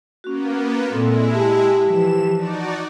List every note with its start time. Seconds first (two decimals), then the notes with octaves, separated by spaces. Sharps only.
0.24 A#3 B3 C#4 F#4
0.92 A#2 G#3 C4 E4 A4
1.34 G4 A5
1.86 E3 F3 E7
2.35 D#4 F#4 D5